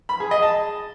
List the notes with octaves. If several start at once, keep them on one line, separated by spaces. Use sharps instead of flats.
B5
G#4
D#5
A5